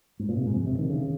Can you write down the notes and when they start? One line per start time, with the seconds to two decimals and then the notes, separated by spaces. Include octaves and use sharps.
0.19 G#2
0.29 A#2
0.37 C3
0.46 G#2
0.55 F2
0.67 C3
0.79 D#3
0.89 C#3